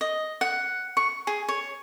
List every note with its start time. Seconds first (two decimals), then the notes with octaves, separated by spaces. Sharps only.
0.01 D#5
0.41 F#5
0.97 C#6
1.27 G#4
1.49 C#5